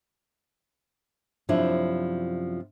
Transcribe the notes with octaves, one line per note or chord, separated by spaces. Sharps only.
F#2 C3 F3 D4 E4